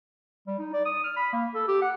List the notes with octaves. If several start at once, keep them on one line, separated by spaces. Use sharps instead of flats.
G3
D#4
D5
D#6
F6
B5
A#3
A4
G4
F#5